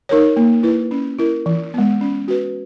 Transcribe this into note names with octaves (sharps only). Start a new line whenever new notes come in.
D#4 A#4 C#5
A#3
E4 B4
C#4
E4 A#4
E3
G#3 B3
C#4
F#4 B4